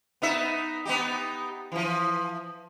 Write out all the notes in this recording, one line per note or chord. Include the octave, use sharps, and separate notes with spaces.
B3 D#4 E5
B3 D#4 G4
E3 F3